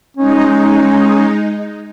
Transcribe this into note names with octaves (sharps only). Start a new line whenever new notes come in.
G#3 C#4 D#4